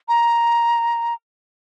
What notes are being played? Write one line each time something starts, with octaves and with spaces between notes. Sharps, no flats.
A#5